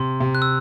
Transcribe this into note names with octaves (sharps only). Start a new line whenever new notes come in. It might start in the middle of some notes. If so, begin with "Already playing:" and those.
Already playing: C3 C6
C3
F#6
E6